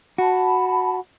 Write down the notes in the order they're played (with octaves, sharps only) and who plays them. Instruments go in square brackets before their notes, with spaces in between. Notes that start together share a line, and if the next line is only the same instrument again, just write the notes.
[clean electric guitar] F#4 [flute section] A5 B5